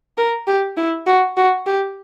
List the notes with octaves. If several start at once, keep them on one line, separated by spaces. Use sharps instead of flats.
A#4
G4
E4
F#4
F#4
G4